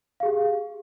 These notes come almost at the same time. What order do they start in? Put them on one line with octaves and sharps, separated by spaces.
F5 G#4 G4